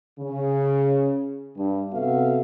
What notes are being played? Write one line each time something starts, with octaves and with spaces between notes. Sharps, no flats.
C#3
G2
C3 B3 F#4 A4 E5 F5